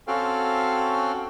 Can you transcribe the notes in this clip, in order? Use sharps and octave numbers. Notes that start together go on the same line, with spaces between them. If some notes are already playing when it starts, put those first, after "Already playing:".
C4 C#4 F#4 A4 F5 G5